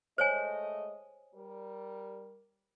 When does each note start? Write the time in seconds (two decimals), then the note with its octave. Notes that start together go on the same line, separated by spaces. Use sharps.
0.18 G#3 A3 C5 C#5 D#5 G#5
1.35 G3 A#4